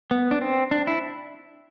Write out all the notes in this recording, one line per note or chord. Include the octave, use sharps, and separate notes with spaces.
B3
D4
C4
D4
E4